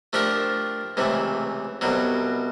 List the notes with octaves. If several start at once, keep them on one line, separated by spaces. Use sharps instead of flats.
F3 A3 D4 G4 A#4
C#2 C3 E3 A3
C2 B2 F#3